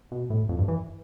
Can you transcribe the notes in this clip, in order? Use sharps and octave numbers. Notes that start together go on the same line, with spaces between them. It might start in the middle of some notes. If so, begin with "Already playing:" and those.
B2
A2
F2
G2
E3